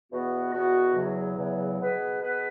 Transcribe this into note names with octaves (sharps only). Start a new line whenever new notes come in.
E2 B2 B3 F#4
E2 B2 B3 F#4
E2 C#3 F#3
E2 C#3 F#3
B2 B3 G#4 B4
B2 B3 G#4 B4